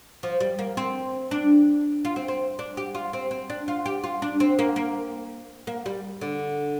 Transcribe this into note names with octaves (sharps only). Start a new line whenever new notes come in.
F3
G3
A#3
C4
D4
F4
C4
C4
D4
G4
F4
C4
C4
D4
F4
G4
F4
D4
C4
A#3
A#3
A#3
G3
D3